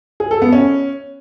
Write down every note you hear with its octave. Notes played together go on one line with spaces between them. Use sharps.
G#4
A4
B3
C#4